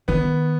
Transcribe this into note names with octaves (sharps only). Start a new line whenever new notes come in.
D#3 B3